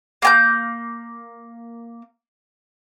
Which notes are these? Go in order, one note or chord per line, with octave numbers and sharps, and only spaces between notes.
A#3 G#5 G6